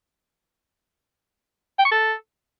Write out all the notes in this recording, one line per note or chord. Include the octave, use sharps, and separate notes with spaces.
G5
C#6
A4